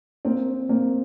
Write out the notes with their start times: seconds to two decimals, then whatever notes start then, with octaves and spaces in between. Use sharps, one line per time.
0.25 A#3 C4
0.69 A#3 C4